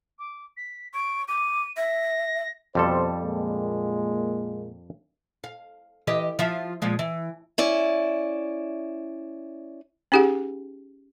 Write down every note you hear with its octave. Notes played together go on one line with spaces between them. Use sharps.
D6
B6
C#6 D7
D6 D#7
E5 A#6
F2 B2 G3 A4 C5
A#2 G#3 A#3
F5
E3 G4 D#5
F3 F4 E5
A#2 F3 G#3
E3
C#4 E4 D5
C#4 D#4 G4 G#4 F#5